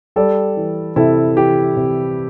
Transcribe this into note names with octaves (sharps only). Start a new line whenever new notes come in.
G3 A4 D5
E3
C3 E4 A4
E3 G4
C3